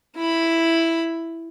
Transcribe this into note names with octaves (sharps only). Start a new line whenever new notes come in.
E4 B5